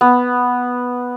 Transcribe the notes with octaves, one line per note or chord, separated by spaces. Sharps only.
B3